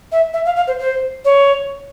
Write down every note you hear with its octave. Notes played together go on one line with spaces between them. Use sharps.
E5
E5
F5
F5
C5
C5
C#5